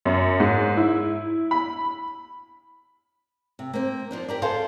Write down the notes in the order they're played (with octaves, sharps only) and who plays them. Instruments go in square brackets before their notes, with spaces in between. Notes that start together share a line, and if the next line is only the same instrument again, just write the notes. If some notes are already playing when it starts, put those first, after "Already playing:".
[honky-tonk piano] F#2
G#2
E4
B5
[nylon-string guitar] C3
A#3 C4
F3 D4 D#4
G4 A#4 D5
F4 G#4 A4 C5 D5 F5